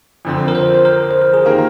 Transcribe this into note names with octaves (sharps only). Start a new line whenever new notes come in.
F2 D3 F3 C4
A#4
C5
C5
A#4
C5
A#4
G#4
D#3 A#3 F4 G4 A#4